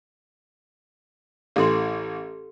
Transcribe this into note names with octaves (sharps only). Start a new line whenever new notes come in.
A1 E3 G4 A4 C6